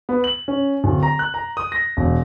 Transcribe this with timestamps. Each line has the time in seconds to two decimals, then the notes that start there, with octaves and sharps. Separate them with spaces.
0.09 B3
0.24 F#7
0.48 C#4
0.84 D1
1.03 A#5
1.19 F#6
1.34 A#5
1.57 D#6
1.72 A#6
1.97 E1